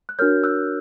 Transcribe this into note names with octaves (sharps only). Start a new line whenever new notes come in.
F#6
D4 F#4 A#4 C#5 F6 G6
E6 F#6